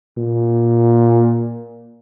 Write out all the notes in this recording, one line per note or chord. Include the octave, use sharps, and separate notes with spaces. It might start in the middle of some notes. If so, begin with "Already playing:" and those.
A#2